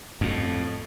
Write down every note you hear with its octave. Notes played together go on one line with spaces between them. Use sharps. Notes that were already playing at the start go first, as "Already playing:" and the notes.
F2 A2